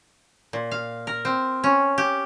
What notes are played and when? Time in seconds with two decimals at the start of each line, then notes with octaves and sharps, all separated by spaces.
0.53 A#2
0.71 F5
1.07 A#4
1.25 C4
1.64 C#4
1.98 G4